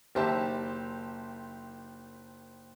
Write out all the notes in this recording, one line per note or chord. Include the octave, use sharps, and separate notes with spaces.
F#1 D#3 G4 C5 E5 A5